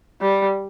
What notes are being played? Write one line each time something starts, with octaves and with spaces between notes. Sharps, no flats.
G3